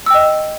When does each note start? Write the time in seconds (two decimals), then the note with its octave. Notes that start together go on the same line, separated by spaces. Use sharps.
0.06 E6
0.10 G5
0.14 D#5